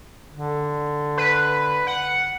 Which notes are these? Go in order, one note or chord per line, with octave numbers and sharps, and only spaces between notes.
D3
B4
F#5